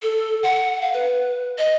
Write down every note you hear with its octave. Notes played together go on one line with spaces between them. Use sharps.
A4
F#5
F5
B4
D#5